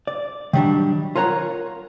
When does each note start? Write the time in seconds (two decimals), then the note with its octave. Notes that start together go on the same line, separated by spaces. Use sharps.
0.07 D5
0.53 D#3 F#3 G3 C4 D4
1.15 F4 A#4 C#5 F#5 A#5